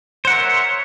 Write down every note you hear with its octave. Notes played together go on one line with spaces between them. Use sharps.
A#4 C5 C#5 E5 F#5